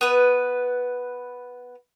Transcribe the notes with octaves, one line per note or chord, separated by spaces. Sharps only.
B3 B4